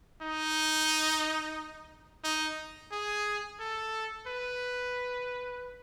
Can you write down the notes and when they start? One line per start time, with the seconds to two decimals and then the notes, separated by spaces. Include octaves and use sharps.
0.22 D#4
2.24 D#4
2.92 G#4
3.60 A4
4.27 B4